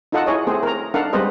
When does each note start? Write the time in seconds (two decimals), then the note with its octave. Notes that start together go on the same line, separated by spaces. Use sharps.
0.12 D#4 F4 A4 D#5 F#5
0.26 E4 G#4 C#5 D#5
0.47 A3 C4 G#4 C5
0.63 A#4 A#5
0.94 D4 D#4 A4 A#4 F5 F#5
1.13 G3 G#3 C4 B4 C5 D#5